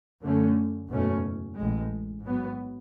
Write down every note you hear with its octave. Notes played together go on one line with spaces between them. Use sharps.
F#2 D3 A3 C#4
F#1 E2 B2 A3 C#4
A1 A2 G#3
G#2 F#3 B3